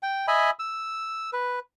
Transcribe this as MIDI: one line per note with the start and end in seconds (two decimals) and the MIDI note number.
0.03 0.26 79
0.28 0.50 75
0.28 0.50 76
0.28 0.50 80
0.28 0.50 83
0.59 1.30 88
1.33 1.59 71